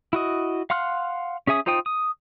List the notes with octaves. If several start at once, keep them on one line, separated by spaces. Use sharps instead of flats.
E4 F#4 D#5
F5 F#5 C6 F6 F#6
C#4 G#4 E5 G#5 D#6
D#4 F4 C5 G5 D#6
D#6